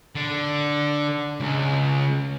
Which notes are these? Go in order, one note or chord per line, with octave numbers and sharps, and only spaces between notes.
D3
C#2